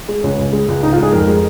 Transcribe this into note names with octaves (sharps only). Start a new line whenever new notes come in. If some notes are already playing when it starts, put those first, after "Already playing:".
G#3
C#2 C#4
C#2
G#3
C#2
G#2 D#4
F4
G#2 G#4
F2 A#4
G#3